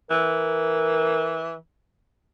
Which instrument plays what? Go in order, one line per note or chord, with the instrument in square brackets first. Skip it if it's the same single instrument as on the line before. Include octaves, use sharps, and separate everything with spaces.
[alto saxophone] E3 [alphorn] A#4